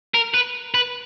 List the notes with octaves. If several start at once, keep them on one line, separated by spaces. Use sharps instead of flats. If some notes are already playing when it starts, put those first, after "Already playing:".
A#4
B4
B4